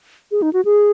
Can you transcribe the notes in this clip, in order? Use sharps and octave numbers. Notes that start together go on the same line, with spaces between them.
G#4
D#4
F#4
G#4